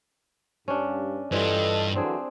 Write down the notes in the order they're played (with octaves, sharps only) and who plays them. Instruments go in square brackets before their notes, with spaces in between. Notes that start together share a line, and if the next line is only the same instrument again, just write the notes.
[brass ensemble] G2 [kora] C#4 D4
[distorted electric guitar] G2 [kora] E3 G3 F4 [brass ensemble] A4 D#5
[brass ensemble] D3 E3 F#3 [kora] C4 D4 G#4